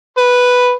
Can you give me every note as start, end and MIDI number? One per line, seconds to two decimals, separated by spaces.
0.18 0.73 71